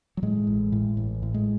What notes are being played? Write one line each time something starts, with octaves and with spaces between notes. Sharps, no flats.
F#3
A2 G#3
A1
A2
A1
A2
G#3